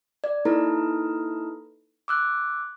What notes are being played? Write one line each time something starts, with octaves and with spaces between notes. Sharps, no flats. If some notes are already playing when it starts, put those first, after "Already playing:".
D5
A#3 D#4 E4 A4 B4 A#5
D6 E6 F#6